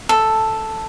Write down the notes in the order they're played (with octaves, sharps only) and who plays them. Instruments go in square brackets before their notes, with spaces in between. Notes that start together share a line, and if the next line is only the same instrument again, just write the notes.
[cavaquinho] A4